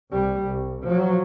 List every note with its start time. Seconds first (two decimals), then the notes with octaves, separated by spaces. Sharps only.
0.11 C2 G3
0.44 C2
0.83 F3 F#3